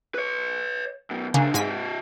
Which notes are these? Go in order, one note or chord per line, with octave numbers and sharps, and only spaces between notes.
B4 C#5
F#2 B2
B1 C#3 A#3 D4
G#2 C3 D#5 G#5 B6